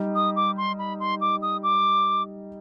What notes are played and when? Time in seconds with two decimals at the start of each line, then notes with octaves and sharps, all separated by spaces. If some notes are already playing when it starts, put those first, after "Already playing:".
Already playing: G3 D#4
0.15 D#6
0.36 D6
0.57 C6
0.79 B5
1.00 C6
1.21 D6
1.42 D#6
1.63 D6